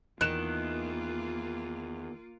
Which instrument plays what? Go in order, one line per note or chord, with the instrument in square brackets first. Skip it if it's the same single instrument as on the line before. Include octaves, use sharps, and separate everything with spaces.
[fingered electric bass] E2 [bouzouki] D#3 [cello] A#3 F4 [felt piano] F#6 E7